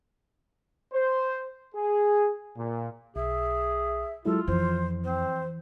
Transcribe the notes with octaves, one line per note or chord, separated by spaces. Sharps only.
C5
G#4
A#2
B1 G#4 E5
F#3 G#3 E4 F4 A4
F2 E3 C5
C4 C5